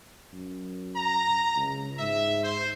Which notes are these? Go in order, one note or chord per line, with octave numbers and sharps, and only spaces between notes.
F#2
A#5
C#2
G#2 E5
C5